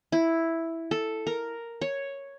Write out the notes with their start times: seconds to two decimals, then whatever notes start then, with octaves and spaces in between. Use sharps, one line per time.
0.12 E4
0.91 A4
1.27 A#4
1.81 C#5